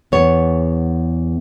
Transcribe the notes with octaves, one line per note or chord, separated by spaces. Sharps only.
E2 B3 C#5